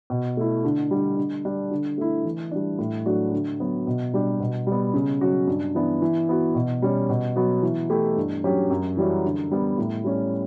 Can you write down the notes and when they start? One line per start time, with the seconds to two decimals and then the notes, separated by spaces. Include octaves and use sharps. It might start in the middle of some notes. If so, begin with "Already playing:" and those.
0.10 B2
0.37 A3 E4
0.64 D3
0.91 G3 D4
1.17 D3
1.45 G3 D4
1.71 D3
1.98 A3 E4
2.25 E3
2.51 G3 D4
2.79 A2
3.06 F#3 A3 D4 F#4
3.33 D3
3.60 F#3 B3
3.87 B2
4.14 G3 D4 G4
4.40 B2
4.67 G3
4.72 B3
4.94 C#3
5.21 F#3 C#4 F#4
5.47 G2
5.75 E3 B3 D4
6.02 E3
6.29 B3 F#4
6.55 B2
6.82 G3 C#4
7.09 B2
7.36 F#3 B3 F#4
7.63 E3
7.90 A3 E4 G4
8.16 G2
8.44 F#3 C#4 G4
8.70 F#2
8.97 E3 G3 C#4 F#4
9.24 D3
9.51 G3 B3
9.78 A2
10.04 G3 C#4